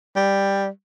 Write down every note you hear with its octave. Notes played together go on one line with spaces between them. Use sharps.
G3